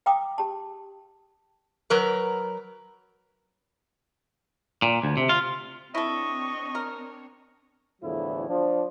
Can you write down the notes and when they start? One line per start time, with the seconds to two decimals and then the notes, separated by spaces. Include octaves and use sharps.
0.06 F5 G5 A#5 D6 D#6
0.38 G4 A5
1.90 F#3 A#4 B4
4.82 A#2
5.03 D2
5.17 C3
5.29 F4
5.95 C4 D4 E4 A4 C#5 D#5 C#6
6.75 A#4
8.02 E2 A2 D3 F3 F#3 E4
8.49 F3 D4